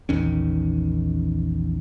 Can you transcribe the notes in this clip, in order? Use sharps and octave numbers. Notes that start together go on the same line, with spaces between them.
A#1 E2 D#3 C#4